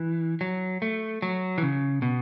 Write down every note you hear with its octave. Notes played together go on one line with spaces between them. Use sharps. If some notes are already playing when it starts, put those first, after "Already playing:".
Already playing: E3
F#3
A3
F#3
E3
C#3
B2